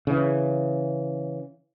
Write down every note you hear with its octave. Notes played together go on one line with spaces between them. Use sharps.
C#3 E3